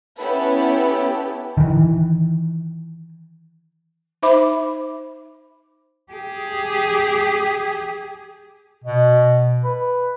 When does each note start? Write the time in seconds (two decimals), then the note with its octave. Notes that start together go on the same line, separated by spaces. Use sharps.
0.18 B3 C#4 E4 G4 A4 B4
1.57 D#3 E3
4.23 D#4 C5 E5 B5 D6
6.12 G4 G#4
8.84 B2
9.64 B4